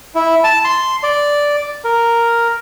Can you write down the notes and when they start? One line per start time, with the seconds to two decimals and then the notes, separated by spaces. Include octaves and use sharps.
0.15 E4
0.44 A5
0.64 C6
1.03 D5
1.85 A#4